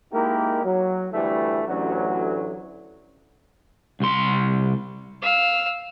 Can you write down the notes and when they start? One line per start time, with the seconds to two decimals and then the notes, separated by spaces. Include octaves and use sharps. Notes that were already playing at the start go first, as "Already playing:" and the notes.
0.13 G#3 A#3 D#4 E4 G4 A#4
0.64 F#3
1.12 D2 E3 G3 A3
1.68 A1 D2 F#3
4.00 C2 C6
5.22 F5 E6